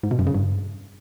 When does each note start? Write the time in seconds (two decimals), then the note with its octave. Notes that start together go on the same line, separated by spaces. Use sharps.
0.03 G#2
0.11 B2
0.19 F#2
0.27 C#3
0.34 G2